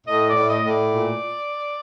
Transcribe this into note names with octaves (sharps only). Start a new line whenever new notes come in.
A2 D#5
D5
A2
D#5
A2
D5
A#2